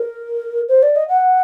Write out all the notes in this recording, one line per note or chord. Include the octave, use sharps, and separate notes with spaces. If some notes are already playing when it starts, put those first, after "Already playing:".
Already playing: A#4
C5
D5
D#5
F#5